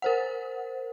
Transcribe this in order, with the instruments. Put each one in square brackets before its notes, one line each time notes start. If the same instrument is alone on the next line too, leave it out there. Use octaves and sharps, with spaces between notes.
[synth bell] A#4 C5 F#5